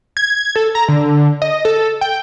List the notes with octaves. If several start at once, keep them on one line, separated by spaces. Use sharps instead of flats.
G#6
A4
A#5
D3
D#5
A4
G5